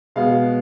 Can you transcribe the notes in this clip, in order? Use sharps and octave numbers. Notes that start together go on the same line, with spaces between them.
B2 G#3 B3 F5